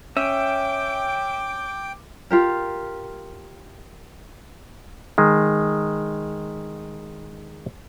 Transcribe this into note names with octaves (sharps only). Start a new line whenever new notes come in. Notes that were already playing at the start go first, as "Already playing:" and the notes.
C#4 E5 G5 D6
F4 G4 A#4
D#3 G#3